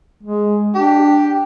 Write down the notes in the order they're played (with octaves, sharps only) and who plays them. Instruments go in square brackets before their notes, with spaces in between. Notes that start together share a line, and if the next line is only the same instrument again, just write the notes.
[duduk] G#3
[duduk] D4 [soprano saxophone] G4